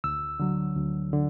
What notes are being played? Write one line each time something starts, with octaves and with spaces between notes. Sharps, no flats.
D2 E6
D3 F#3
D2
D3